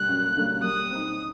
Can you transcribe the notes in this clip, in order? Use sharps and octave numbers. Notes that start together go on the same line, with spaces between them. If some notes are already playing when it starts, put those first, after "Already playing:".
Already playing: D3 G3 A#3 F#6
F#2
D3 G3 A#3
G3 D#6
C4 D#4